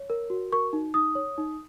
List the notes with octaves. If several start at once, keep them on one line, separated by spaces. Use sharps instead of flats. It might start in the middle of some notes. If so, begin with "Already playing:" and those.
Already playing: C#5
A#4
F#4
A#4 C#6
D#4
D#4 D#6
C#5
D#4